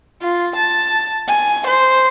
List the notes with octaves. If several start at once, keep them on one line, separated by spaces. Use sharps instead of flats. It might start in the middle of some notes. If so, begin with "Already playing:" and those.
F4
A5
G#5
C5